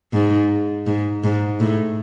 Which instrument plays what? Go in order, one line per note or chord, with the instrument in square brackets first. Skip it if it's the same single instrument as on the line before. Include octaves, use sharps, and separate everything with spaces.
[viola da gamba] G#2
G#2
G#2
A2